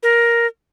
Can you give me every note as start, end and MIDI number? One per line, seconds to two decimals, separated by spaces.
0.03 0.47 70